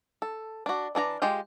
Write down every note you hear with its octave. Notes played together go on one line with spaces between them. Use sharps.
A4
D4 F#4
E3 D4 G#4 A#5
G#3 F4 G4 G5